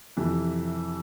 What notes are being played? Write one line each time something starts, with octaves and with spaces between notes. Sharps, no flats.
F2 C3 E3